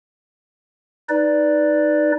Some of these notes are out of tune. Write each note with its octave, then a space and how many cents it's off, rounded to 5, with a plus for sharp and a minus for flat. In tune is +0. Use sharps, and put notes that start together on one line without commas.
D#4 +0 B4 +0 D5 +0